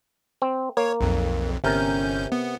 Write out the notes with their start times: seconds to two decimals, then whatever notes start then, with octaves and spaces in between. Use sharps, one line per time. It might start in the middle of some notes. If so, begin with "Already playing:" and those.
0.42 C4
0.77 A#3 C#5
1.01 B1 F2
1.64 G1 C3 C#4 A#4 G6
2.32 B3